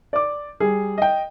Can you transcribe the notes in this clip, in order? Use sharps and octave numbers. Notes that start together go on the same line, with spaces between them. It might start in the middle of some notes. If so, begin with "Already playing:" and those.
D5 D6
G3 G#4
D#5 G5